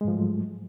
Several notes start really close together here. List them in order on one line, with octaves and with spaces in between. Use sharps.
G#3 G#2 F3 A3 F#3